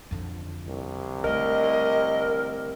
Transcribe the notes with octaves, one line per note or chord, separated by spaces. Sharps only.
F2 D3
C2
D3 A3 A#4 D#5